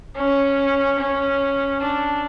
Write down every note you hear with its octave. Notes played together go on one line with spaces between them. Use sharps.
C#4
C#4
D4